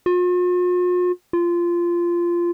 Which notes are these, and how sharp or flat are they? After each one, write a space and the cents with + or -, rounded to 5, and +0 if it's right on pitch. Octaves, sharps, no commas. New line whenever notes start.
F4 +45
F4 -15